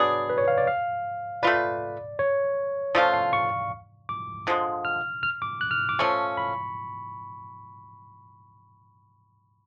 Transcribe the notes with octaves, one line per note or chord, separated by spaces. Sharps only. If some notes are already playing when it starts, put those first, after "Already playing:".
Already playing: F#3 B3 D4 G#4 D5
B4
C#5
F5
D5
F5
A3 F4 B4 D5
C#5
F3 A3 C#4 F4 D5
F5
C#6
D6
D3 F3 G#3
F6
F6
D6
F#6
F6
D6
F3 A3 C#4 C#6
B5